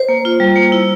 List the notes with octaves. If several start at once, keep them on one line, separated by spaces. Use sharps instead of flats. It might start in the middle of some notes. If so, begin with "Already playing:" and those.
Already playing: C5
A#3
F4
G3
A#3
E4